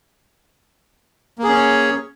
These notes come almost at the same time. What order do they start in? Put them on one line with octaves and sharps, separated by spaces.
A#3 G#4 C#4 C#5